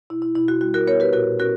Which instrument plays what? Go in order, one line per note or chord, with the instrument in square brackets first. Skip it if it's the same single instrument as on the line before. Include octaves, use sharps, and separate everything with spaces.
[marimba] B2 E4
E4
B2 E4
F#4
G3 F#4
F#4 A#4
B3 A#4 C#5
G4 B4
A#2 F#4 A#4
C#4 F#4 A#4